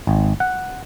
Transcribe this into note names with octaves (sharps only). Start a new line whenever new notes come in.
G#1
F#5